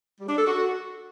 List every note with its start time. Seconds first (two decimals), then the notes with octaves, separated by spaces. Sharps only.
0.20 G3
0.29 D4
0.38 A4
0.46 F#4